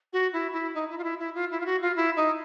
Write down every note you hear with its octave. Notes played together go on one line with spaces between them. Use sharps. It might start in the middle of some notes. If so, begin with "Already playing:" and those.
F#4
E4
E4
D#4
E4
F4
E4
E4
F4
E4
F4
F#4
F4
E4
D#4